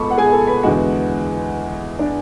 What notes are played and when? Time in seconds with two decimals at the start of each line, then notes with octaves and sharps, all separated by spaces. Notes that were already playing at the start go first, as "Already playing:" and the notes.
Already playing: C#2 B2 G#3 A4 A5 B5 C#6 D6
0.10 F#5
0.17 G#4 G#5
0.33 A4 A5
0.47 B4 B5
0.63 E2 D3 G#3 F#4 F#5
1.99 D4 D5